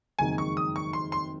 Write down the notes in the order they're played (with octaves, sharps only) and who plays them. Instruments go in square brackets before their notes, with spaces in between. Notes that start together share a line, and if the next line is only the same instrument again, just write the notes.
[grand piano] F#1 F2 D#3 G#3 D#4 [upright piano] G#5
[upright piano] C#6
D#6
C#6
C6
C6